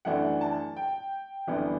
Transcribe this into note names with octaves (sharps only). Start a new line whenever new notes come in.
F#2 E3 A3 D4 F#5
A5
G5
G1 F#2 E3 B3 D4